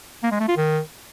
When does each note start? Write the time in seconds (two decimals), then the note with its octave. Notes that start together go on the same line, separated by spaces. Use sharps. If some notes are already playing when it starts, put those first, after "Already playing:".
0.23 A#3
0.32 G#3
0.40 A3
0.48 F4
0.57 D#3